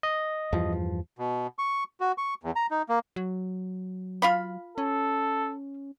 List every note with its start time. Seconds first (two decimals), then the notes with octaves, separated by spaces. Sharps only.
0.03 D#5
0.53 E2 G2 F3
1.18 B2
1.58 C#6
2.00 F#4
2.18 C#6
2.43 E2
2.56 A#5
2.71 D#4
2.89 A#3
3.16 F#3
4.22 F4 F5 B5
4.78 C#4 A4